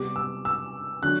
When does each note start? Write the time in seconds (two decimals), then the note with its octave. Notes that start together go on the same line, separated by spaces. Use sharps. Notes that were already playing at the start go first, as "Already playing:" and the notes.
Already playing: C3 G3 B3 D6
0.16 E6
0.45 E6
1.03 D3 F#3 F#6